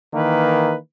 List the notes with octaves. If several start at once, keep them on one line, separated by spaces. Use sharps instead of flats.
D#3 E3 A#3 B4